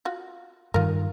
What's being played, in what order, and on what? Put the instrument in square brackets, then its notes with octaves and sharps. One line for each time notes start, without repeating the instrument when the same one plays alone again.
[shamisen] F4 F#4
[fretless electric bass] G2 D#3 [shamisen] F4 A#4